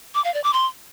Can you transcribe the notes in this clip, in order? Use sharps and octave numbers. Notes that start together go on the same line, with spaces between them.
D6
F5
D5
D6
C6